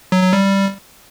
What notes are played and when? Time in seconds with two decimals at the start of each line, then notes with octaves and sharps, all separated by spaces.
0.12 F#3
0.22 F#3
0.33 G3